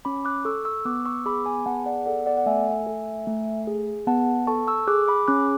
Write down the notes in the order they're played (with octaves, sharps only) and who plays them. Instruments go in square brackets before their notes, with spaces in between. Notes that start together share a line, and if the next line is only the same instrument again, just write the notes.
[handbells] C#4 B5 D6
D6 F#6
A4 C#6 E6
C#6 E6
B3 D6 F#6
C#6 E6
G#4 B5 D6
G#5 B5
B3 F#5 A5
D5 F#5
A4 D5 F#5
D5 F#5
F#5
A3 E5 G#5
A4
A3
G#4
B3 F#5 A5
A4 A5 C#6
C#6 E6
G#4 D6 F#6
B5 D6
C#4 D6 F#6